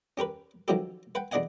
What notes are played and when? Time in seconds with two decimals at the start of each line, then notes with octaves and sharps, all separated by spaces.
0.17 C#4 G4 A#4 B4
0.68 D#3 F3 F#3 C#4 G4 A4
1.15 B4 F#5 G5
1.31 E2 D4 D5 D#5 F#5 G#5